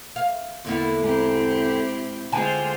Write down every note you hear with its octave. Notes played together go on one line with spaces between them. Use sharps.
F5
E2 D3 A#3 B3 E4
G#2 C4 E4 G4
D3 G#3 F4 C5 G5 G#5